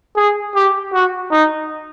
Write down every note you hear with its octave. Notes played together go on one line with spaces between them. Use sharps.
G#4
G4
F#4
D#4